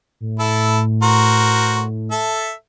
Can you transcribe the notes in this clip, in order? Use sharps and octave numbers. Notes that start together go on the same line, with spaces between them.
A2
E4 A4
F#4 A#4 C5
A4 E5